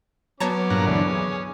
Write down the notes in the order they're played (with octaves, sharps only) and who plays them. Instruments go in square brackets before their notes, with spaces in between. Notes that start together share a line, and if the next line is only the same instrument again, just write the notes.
[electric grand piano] F#3 B3 [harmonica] C#4 B4 D6 [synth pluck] C#5 A5 A#5
[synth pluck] G2 [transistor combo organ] A#2 F#5 A#5
[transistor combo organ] D2 D3 E3
G#4